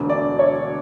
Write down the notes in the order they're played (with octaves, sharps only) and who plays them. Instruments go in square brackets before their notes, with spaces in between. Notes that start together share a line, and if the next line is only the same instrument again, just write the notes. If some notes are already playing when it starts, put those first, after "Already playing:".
Already playing: [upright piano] E1 D2 D3
D5
C#5